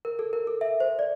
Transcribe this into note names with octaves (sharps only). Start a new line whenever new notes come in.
A#4
A4
A#4
A4
E5
C5
D5